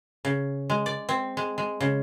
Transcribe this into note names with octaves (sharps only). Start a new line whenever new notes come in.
C#3
G#3
D5
C4
G#3
G#3
C#3